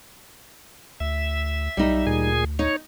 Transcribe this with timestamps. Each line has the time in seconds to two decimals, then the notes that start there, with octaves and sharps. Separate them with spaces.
1.00 D2 E5
1.77 B1 G3 D#4
2.07 D2 A#2 G#4 G#5
2.59 D#4 C#5